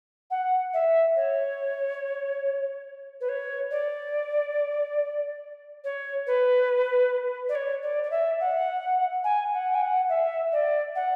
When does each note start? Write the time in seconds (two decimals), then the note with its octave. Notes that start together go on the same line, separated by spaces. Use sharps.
0.30 F#5
0.73 E5
1.16 C#5
3.21 B4
3.29 C#5
3.71 D5
5.84 C#5
6.27 B4
7.49 D5
7.55 C#5
7.82 D5
8.03 D5
8.11 E5
8.40 F#5
9.24 G#5
9.53 F#5
9.74 G#5
9.82 F#5
10.09 E5
10.52 D5
10.95 F#5